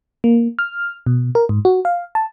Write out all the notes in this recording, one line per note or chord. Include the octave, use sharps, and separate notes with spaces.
A#3
F6
B2
A#4
G#2
F#4
F5
A5